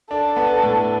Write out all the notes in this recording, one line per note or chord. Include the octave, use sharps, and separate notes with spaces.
D4 A4
B3
A2